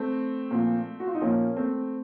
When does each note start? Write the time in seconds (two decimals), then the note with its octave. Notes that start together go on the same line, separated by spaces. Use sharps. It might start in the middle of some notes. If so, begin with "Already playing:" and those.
Already playing: A3 C4
0.51 A#2 F3
1.00 F#4
1.07 F4
1.15 D#4
1.22 A#2 F3 A#3 C#4
1.56 A3 C4